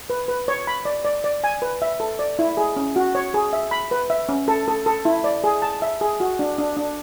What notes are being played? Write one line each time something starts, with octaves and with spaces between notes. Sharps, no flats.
B4
B4
C#5
B5
D5
D5
D5
G#5
B4
E5
A4
D5
E4
G#4
C#4
F#4
C#5
G#4
E5
B5
B4
E5
C#4
A4
A4
A4
E4
D5
G#4
A5
E5
G#4
F#4
D4
D4
D4